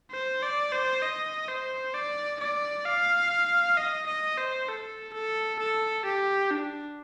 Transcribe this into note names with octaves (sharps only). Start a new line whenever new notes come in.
C5
D5
C5
D#5
C5
D5
D5
F5
D#5
D#5
C5
A4
A4
A4
G4
D4